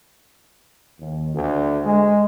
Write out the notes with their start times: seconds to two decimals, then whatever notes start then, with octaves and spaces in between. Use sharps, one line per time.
0.99 D#2
1.35 D2
1.85 G#3